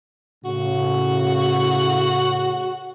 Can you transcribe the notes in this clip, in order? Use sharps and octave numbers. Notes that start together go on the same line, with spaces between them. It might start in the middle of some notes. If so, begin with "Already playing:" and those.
A2 C#3 F#4